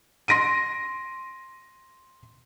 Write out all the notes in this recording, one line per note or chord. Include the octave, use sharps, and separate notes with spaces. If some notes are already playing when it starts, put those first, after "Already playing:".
C6 A#6 D7 D#7